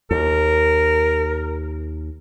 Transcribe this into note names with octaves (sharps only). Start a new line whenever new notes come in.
D#2 A#4